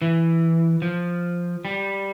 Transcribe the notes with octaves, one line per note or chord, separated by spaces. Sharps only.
E3
F3
G3